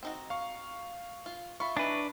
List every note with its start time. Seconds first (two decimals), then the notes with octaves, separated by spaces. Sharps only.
0.03 C4 D#4 F#4
0.30 F5 C#6
1.26 F4
1.60 F4 E5 B5 C#6
1.77 E3 D4 D#4 B4